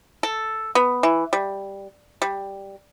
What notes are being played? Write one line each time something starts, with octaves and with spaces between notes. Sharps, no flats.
A4
B3
E3
G3
G3